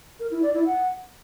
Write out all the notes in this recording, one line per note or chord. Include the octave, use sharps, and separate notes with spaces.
A#4
E4
D5
E4
F#5